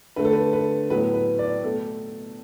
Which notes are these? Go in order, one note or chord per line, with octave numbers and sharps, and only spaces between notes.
D3 A3 B4
A4
B4
B4
A2 F#3 B3 B4
B4
D5
B2 A3 A4